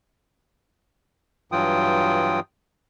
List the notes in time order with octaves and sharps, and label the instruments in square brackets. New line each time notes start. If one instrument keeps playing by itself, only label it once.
[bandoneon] G2 E3 F#3 F4 G5 D#6